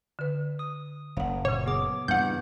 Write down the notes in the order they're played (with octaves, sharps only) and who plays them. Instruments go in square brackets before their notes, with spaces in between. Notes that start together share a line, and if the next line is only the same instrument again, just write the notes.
[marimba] D3 B4
[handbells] D#6
[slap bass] F#1 [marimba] F5 F#5
[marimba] A#2 C#3 [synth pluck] C#5
[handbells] B3 G#4 D6
[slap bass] G2 E3 [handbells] B3 [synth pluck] F#5 G6